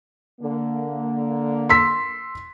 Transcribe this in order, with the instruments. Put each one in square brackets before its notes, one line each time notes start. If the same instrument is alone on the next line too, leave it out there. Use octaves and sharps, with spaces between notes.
[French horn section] D3 A#3
[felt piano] C6 E6 B6